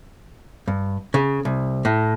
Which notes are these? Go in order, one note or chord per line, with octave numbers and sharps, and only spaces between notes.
G2
C#3
C2
A2